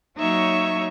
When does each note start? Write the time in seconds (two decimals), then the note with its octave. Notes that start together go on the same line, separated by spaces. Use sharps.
0.17 F#3 A#3 D#4 C#5 E5 C#6